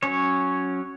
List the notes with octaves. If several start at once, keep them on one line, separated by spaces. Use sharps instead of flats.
F#3 C#4 C#5